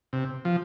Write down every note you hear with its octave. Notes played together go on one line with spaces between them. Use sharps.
C3
F3